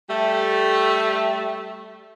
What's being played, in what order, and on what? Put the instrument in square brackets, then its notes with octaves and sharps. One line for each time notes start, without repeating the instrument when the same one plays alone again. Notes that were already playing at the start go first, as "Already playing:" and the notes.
[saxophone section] G3 A3